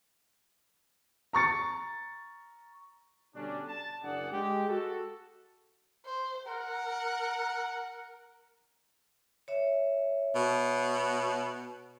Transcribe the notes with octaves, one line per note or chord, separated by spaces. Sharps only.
A#5 C#6 A6 C#7
B2 D3 G3 C#4 D4
A5
F#1 A#3 D4 G#4 D5 F#5
G#3 G4
F#4 A4
C5
A#4 F#5
C#5 E5
B2